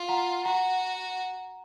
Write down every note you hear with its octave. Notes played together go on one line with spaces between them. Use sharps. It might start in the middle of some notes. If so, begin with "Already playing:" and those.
Already playing: F4
F#5 A#5
F#4 F#5 A#5